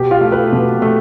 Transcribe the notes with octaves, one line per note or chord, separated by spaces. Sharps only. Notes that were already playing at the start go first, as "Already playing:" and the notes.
Already playing: B2 G4
F4
A3
B4
B2
A3